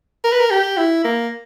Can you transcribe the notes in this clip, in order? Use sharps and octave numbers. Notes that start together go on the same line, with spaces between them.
A#4
B4
A#4
G4
E4
A#3